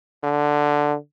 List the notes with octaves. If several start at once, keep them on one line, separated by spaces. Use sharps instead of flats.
D3